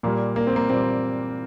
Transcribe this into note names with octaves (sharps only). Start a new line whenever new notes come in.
A#2 G3 A#3
A#3
C4
A#3
A#2 G3 C4